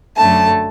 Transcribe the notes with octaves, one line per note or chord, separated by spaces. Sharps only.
F#2 D3 A3 A5